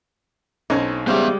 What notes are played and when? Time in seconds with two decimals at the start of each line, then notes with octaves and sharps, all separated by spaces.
0.70 B1 C4 C#4 D#4
1.07 C#3 G3 G#3 B3 C5 E5 F5